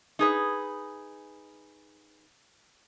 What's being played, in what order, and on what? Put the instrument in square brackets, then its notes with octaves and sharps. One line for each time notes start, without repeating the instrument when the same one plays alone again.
[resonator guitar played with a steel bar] D#4 G#4 B4